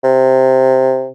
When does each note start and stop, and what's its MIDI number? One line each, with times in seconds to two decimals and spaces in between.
0.04 1.10 48